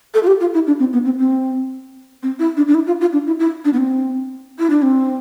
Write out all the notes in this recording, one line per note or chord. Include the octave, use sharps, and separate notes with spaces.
A4
F4
G4
F4
E4
D4
C4
B3
C4
C4
C4
E4
D4
D4
E4
F4
F4
D4
E4
E4
D4
B3
C4
E4
D4
C4